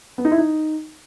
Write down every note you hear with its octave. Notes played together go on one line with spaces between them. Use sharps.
B3
D#4
E4
D#4